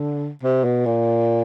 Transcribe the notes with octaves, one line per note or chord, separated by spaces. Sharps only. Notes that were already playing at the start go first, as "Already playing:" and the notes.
Already playing: D3
C3
B2
A#2